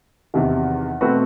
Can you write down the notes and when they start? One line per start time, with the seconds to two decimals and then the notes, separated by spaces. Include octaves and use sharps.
0.34 E2 C3 D#3
1.01 B2 A3 C4 F#4 B4